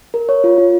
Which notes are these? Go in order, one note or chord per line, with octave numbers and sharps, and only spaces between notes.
A#4
C#5
F4
F4